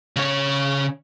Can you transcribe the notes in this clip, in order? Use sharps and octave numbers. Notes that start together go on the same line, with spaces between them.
C#3 C#5